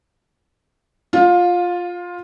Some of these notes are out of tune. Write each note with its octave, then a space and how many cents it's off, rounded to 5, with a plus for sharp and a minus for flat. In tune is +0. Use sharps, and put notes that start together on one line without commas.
F4 +5 F5 +25